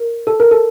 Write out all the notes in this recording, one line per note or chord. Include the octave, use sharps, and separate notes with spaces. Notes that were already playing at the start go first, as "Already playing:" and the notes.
Already playing: A#4
A4
A#4
A4